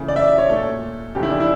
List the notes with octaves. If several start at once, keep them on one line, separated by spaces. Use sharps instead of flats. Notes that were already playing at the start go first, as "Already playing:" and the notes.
Already playing: C#3 E3 A3
D5
E5
D5
C#5
A#2 A3 A4
E2 C#3 F3 A3 G4
E4
D4
E4